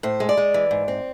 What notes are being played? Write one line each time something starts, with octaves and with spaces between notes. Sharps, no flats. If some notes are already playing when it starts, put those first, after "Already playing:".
A2 C5
G#3
D5
G#3
E3
G#2
C4